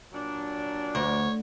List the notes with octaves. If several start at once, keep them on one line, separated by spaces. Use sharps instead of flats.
A#2 F#3 D4
D2 C#5